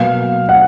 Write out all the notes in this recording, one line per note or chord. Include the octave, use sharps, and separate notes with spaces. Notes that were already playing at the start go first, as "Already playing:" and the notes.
Already playing: B2 F#3 A#3 F5
F#5